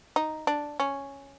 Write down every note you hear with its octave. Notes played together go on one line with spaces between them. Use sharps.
D#4
D4
C#4